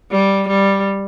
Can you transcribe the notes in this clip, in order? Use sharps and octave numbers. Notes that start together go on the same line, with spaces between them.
G3
G3